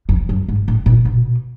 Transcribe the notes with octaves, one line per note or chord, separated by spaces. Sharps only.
F2
F#2
G#2
A2
A#2
B2